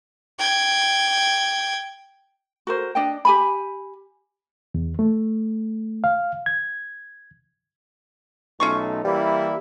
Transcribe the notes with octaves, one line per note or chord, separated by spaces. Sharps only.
G5 G#6
F#4 A#4 C5
D4 D#5 G5
G4 G#5 B5
E2
A3
F5
G#6
B1 A3 C#4 D#4 F4 C#6
E3 G3 A#3 E4